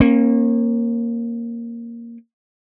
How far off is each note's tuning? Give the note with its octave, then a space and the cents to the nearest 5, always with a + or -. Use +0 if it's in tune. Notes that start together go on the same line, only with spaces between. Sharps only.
A#3 +0 C#4 -40